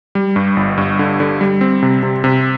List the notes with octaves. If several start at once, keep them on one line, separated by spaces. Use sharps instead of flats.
G3
G2
G1
G2
D3
D3
G3
C4
C3
C3
C3